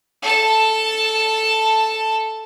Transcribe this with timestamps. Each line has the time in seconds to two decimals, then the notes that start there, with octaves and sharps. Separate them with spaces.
0.22 A4 A5